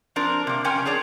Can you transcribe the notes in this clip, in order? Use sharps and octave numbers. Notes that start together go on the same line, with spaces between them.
F3 C4 D4 A#4
C3 A#3
F2 C3 C#4 A#4 G5 G#5
D4 G#4 C#5 D5